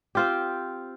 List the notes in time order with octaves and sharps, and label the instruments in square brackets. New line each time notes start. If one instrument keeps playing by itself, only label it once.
[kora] C4 F4 G4